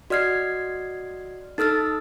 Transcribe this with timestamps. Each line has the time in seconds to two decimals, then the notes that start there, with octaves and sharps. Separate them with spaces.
0.10 F#4 D5 D#5 F6 G#6 C7
1.58 D#4 A4 E6 F6 A6